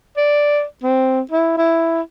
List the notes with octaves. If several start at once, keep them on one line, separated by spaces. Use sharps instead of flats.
D5
C4
E4
E4